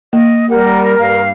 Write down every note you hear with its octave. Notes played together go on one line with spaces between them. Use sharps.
A#3 D#5
G3 A#4 F#5
G2 F5